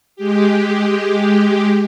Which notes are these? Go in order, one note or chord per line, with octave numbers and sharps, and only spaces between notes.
G#3 G4